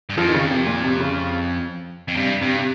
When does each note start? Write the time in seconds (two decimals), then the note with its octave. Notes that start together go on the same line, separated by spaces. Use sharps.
0.09 G2
0.17 F2 F3
0.28 D#3
0.34 C#3
0.51 C3
0.67 A#2
0.84 C3
1.00 C#3
2.08 F2
2.17 G2 C3
2.41 G2 C3
2.58 C3